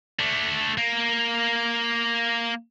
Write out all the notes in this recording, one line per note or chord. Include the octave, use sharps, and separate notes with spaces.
A3 D4
A#3